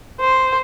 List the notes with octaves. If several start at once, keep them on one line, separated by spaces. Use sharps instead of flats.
C5